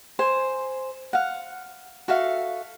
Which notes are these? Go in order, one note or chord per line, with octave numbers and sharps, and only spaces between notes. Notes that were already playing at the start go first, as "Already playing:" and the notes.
C5 G#5
F5 F#5
F#4 A4 E5 F5